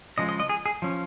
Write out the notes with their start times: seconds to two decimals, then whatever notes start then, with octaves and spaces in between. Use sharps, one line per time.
0.18 C#3 F3 G#3 D#5
0.29 D#5
0.40 D#5
0.49 G#4
0.66 G#4
0.82 F3 C#4